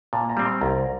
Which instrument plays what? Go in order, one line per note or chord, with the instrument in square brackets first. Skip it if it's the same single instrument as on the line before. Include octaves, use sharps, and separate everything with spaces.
[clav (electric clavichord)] A#2 [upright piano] A5
[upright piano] A#5
[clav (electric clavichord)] G3 C4
[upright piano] C6
[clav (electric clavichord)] C2 [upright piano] A#5